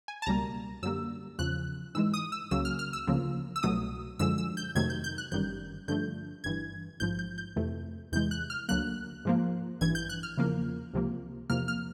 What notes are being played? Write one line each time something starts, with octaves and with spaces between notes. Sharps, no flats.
G#5
A5
C#2 B2 G3 A#3 A#5
F#2 D3 G3 A#3 E6
E2 C#3 F3 F#6
G#2 E3 G#3 E6
D#6
E6
C#2 C#3 F#3 A#3 E6
F6
F6
E6
D2 C#3 F3 A#3
E6
C2 B2 F#3 A3 D#6
F#2 D3 F3 G#3 E6
E6
G6
F2 C3 D#3 F#3 A3 G#6
G6
G6
F#6
G1 F#2 D#3 G3 G6
G2 D3 F3 A3 G6
G1 G2 E3 G#6
A1 G#2 F3 G6
G6
G6
F2 C3 E3 A3
E2 C3 E3 G#3 G6
F#6
F6
D2 D3 F#3 A#3 F#6
G#2 F3 A#3
A1 G2 E3 G#6
G6
F#6
F6
E2 C#3 F3 A#3
C#2 C3 F3 A#3
E2 C3 F3 A#3 F6
F6